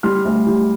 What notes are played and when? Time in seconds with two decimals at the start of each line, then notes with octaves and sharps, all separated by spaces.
0.03 G3 C6 F6
0.25 D2
0.47 G3